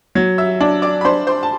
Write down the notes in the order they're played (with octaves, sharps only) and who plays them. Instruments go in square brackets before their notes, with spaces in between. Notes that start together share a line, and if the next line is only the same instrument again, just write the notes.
[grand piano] F#3
[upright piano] E5 E6
[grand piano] D4
[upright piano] D5 D6
B5
[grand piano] D4 [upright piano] C5 C6
[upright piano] C5 C6
A5